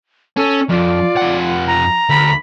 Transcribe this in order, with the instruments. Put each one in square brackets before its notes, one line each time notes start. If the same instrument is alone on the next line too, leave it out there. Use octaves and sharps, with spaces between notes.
[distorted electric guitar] C#4 [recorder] A4
[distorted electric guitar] F2 [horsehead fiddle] F4 [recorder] D5
[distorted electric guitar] F2 F#5
[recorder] A#5
[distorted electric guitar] D2 [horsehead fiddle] B5